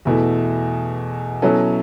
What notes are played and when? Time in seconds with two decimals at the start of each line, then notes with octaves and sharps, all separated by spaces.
0.05 E2 B2 A3 E4
1.42 B2 F#3 C#4 E4 A4